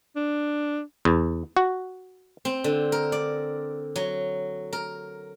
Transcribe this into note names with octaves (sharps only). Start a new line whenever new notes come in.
D4
E2
F#4
C4
D3
A#4
D5
F#3
A#4